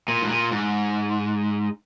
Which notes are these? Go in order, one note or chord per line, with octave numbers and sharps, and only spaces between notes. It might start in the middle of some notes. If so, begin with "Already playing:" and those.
A#2
G#2
A#2
G#2